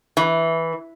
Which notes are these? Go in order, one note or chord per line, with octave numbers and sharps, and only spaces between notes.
E3